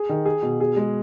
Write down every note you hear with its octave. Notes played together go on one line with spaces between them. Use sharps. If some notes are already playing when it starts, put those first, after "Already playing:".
Already playing: G#4
D#3
G#4
B2
G#4
G#3